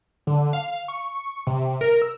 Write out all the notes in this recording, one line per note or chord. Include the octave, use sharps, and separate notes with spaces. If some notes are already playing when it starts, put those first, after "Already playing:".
D3
F5
C#6
C3
A#4
E6